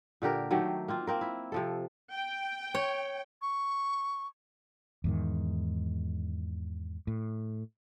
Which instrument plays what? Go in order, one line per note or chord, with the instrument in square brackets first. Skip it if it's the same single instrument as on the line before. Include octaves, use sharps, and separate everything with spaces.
[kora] A#2 D3 G4 A#4
D#3 F#3 A3 G4
A#3 C4 F4
A#3 C4 A#4
E4
C3 F3 A4
[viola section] G5
[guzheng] C#5
[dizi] C#6
[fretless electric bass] E2 G#2 D#3
A2